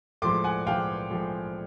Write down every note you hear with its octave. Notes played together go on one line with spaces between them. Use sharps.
A2 F3 G#3 C6 D6
F#5 G#5
A2 F3 G#3 F5 G5
A2 F3 G#3